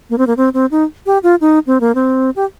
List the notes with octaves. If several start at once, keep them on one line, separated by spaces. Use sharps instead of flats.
A#3
C4
A#3
C4
C4
D#4
G4
F4
D#4
C4
A#3
C4
G4